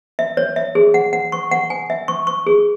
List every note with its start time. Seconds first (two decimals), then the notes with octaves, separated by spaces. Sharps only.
0.19 E5
0.37 C#5
0.56 E5
0.75 G#4
0.94 F#5
1.13 F#5
1.32 C#6
1.51 F#5
1.70 G#5
1.90 E5
2.08 C#6
2.27 C#6
2.46 G#4